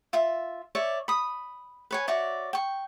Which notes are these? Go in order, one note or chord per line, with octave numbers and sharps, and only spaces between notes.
F4 E5
C#5 D5 E5
B5 D#6
B4 C#5 G#5
F#4 C#5 D5 E5
G5 C#6